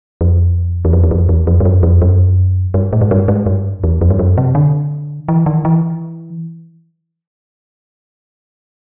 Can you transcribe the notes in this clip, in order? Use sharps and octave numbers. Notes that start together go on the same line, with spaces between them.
F2
E2
F2
E2
F2
E2
F2
G2
F#2
F2
F#2
G2
A2
G#2
G2
G#2
G2
E2
F2
G2
F#2
C3
D3
E3
D#3
E3